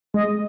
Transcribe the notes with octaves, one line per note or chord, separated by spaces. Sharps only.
G#3 D#5